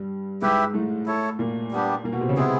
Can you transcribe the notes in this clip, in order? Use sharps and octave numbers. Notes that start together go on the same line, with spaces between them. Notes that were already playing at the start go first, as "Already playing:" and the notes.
Already playing: G2 G3
G#2 G#3 E4 G4 B4 E5
A2 A3
E4 A4 C#5
A#2 A#3
G3 B3 D4 G4
A#2 A#3
B2 B3
C3 C4
C#3 C#4
C3 G#3 B3 C4 E4 G#4